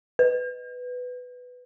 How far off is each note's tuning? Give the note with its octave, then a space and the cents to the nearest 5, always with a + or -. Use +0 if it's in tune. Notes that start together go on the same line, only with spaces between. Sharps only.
B4 +10